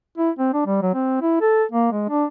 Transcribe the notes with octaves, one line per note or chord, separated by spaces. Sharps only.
E4
C4
D4
G3
F#3
C4
E4
A4
A#3
G#3
D4